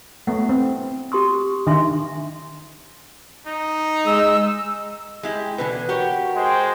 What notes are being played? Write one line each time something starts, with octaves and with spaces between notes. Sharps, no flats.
A3 B3 F#5
C4
G4 C6 D#6
D#3 D4 E5 C6
D#4
G#3 E6
G#3 E4 G4
B2 D3 E3 B4
F#4 G4 A#4 C#5
G#3 C5 G5